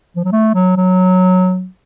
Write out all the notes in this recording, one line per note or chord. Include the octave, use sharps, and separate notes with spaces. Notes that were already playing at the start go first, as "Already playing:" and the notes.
F3
F#3
A3
F#3
F#3